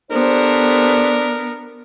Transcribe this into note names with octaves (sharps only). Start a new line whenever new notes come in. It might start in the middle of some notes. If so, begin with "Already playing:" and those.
B3 D4 G4 A4 A#4 C5